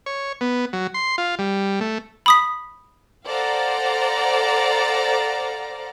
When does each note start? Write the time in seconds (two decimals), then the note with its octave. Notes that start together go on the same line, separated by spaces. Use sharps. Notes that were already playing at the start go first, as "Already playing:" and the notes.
0.06 C#5
0.41 B3
0.73 F#3
0.94 C6
1.18 F4
1.39 G3
1.81 A3
2.26 B5 D#6 B6
3.27 A4 C5 D5 F5 F#5 A#5